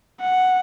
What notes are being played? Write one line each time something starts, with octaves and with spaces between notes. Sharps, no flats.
F#5